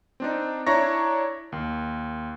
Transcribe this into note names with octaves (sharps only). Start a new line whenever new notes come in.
C4 D4 D#4
D4 E4 C#5 A#5 C#6 A#6
D#2